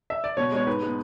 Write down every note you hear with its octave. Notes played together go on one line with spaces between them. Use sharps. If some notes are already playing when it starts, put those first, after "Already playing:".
E5
D5
B2 C#5
G#3 B3 C#5
G#2 B4
G#3 B3